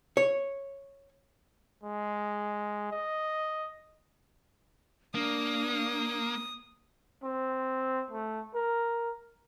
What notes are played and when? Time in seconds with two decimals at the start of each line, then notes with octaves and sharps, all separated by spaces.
0.17 C#5
1.84 G#3
2.92 D#5
5.15 A#3 D4 D#6
7.24 C4
8.11 A3
8.55 A#4